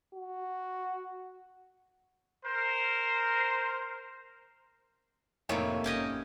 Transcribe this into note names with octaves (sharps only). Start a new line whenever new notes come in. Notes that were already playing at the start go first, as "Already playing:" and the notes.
F#4
A#4 C5
F2 A2 C3 D#3 A3 A#3 E4 C#5
F#1 C#4 G4 D#5